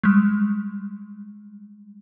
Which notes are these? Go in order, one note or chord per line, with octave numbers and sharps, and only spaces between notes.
G3 G#3